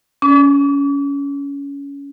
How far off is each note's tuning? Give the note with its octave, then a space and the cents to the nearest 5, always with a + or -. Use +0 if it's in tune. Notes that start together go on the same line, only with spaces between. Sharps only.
C#4 +20 D6 -40